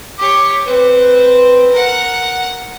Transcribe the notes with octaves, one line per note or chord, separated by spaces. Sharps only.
G4 C#5 D6
C4 B4
A#4 F#5